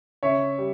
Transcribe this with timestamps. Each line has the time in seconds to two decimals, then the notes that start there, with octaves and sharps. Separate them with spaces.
0.23 C#3 C#5 E5
0.58 G3